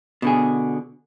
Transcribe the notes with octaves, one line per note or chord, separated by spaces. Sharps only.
B2 D3 G#4